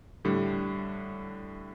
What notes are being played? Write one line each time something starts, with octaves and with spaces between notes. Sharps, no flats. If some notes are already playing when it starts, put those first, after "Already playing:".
A2 D3 G3